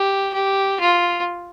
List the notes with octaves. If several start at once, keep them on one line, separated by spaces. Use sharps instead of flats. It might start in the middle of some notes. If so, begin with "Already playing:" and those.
Already playing: G4
G4
F4